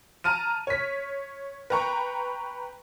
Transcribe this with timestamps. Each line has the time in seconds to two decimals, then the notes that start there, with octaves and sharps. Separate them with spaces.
0.24 A5 A#5 F6 D#7
0.67 C#5 B6
1.70 B4 G5 A#5 C#6